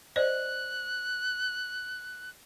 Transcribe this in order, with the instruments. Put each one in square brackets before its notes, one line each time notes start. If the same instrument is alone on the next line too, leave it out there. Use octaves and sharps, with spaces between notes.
[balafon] C5 D5 D#5 [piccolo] F#6